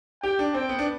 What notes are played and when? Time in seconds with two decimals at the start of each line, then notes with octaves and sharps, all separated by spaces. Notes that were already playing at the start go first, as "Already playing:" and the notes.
0.23 G4 G5
0.39 D4
0.54 C4 G5
0.69 B3
0.79 D4